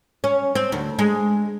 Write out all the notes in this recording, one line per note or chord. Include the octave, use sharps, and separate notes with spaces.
C#4
C4
D2
G#3